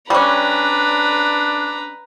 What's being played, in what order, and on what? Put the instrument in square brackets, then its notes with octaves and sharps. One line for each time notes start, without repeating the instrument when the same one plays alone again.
[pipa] G3 C#4 [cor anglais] D4 [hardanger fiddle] B4 A#5